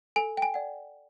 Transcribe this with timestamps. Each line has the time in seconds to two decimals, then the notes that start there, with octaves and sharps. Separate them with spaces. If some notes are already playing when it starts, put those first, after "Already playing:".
0.16 A4 G#5
0.37 G5
0.42 G#5
0.54 D5 F#5